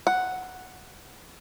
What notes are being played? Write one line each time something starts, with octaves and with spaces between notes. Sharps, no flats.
F#5